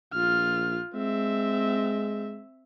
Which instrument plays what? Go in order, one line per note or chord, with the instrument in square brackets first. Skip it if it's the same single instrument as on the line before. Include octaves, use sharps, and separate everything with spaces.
[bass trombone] A#1 [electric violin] F4 F6
[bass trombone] G#3 [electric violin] C4 E5